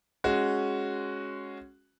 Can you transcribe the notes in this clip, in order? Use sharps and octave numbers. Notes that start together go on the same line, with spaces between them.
G#3 C#4 F#4